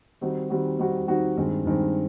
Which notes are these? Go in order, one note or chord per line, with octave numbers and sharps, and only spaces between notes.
D#3 G3 C4 D#4 F#4
D#3 G3 C4 D#4 F#4
D#3 G3 C4 D#4 F#4
D#3 G3 C4 D#4 F#4
G2 D#3 G#3 C4
G2 D#3 G#3 C4